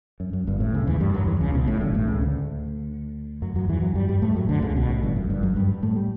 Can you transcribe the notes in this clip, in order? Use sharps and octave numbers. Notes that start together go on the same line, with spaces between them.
F#2
F#2
G1 G2
A1 A2
C#2 C#3
E2 E3
G2 G3
F#2 F#3
E2 E3
C#2 C#3
B1 B2
A1 A2
G1 G2
A1 A2
C#2 C#3
D2 D3
F#2 F#3
F#2 F#3
E2 E3
F#2 F#3
G2 G3
G2 G3
A2 A3
F#2 F#3
D2 D3
C#2 C#3
B1 B2
A1 A2
G1 G2
F#2
G1 G2
F#2 F#3
G2 G3
A2 A3
G3